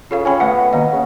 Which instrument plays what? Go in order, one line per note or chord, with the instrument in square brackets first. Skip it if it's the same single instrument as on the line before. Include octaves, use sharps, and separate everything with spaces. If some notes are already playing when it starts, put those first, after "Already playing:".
[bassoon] C#3 [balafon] F4 A4 F5
[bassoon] C#4 [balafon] G5 G#5 B5
[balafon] A3 E5 F#5 [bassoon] B3
[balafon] D#3 A#3 D#5
[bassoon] C#3